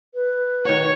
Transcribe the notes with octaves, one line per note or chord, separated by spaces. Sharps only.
B4
D#3 F#4 C#5